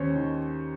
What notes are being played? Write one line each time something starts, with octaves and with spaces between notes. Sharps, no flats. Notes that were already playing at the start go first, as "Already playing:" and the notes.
Already playing: D#2 C#4 C5 C#5
D#3